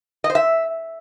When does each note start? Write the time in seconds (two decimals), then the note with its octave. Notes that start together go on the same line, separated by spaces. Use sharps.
0.24 D#5
0.30 C5
0.35 E5